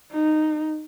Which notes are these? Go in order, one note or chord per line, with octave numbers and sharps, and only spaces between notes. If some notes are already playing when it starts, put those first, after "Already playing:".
D#4